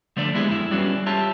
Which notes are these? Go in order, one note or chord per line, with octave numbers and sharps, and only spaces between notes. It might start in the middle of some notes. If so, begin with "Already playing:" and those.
D3 F3 A3 D4 D5
G#3 B3 E4 G4 G#4
F2 E4
G3 B3 C#4 D4 F#4 G#4
D4 F4 G4 C#5 E5 A5